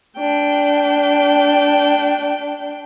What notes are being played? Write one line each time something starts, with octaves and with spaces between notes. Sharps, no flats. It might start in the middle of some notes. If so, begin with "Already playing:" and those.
D4 G5